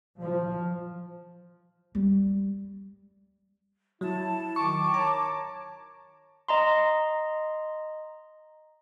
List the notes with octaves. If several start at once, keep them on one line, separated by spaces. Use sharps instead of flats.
F3
G3
F#3 E4 A5
D#3 A5 C#6 D6
C#5 A#5
D#5 A#5 C6